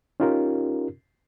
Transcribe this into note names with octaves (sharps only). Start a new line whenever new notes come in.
C#4 D#4 F4 G4 A#4